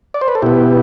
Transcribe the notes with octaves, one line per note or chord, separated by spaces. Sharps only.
D5
C5
B4
A4
B2 B3 E4 G4